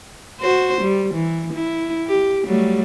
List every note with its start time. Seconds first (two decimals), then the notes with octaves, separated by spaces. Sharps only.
0.41 F#4 C5
0.81 G3
1.14 E3
1.53 E4
2.07 G4
2.46 F#3 G3 A3